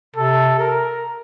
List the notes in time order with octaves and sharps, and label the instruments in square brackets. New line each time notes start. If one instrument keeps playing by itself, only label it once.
[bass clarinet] C3 [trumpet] A4
[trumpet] A#4